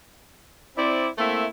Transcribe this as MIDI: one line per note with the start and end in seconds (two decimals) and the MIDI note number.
0.76 1.08 60
0.76 1.08 64
0.76 1.08 74
1.18 1.45 57
1.18 1.45 58
1.18 1.45 60
1.18 1.45 64
1.18 1.45 76